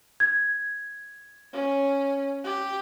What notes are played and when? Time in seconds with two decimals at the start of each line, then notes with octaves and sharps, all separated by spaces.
0.20 G#6
1.53 C#4
2.44 G4